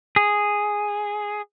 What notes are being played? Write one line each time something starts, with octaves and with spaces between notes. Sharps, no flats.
G#4